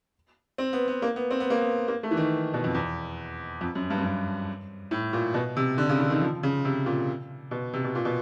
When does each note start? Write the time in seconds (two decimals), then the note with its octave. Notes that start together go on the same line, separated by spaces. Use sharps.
0.58 C4
0.73 B3
0.88 B3
1.02 A#3
1.16 B3
1.31 C4
1.40 B3
1.50 A#3
1.61 B3
1.88 A#3
2.03 A3
2.11 E3
2.17 D#3
2.54 B2
2.64 F2
2.74 E2
3.61 F2
3.75 F#2
3.90 G2
3.98 F#2
4.05 G2
4.91 A2
5.13 A#2
5.34 B2
5.57 C3
5.78 D3
5.89 C#3
6.00 D3
6.10 D#3
6.21 F3
6.43 C#3
6.65 C3
6.86 A#2
7.51 B2
7.74 C3
7.84 B2
7.95 A#2
8.05 B2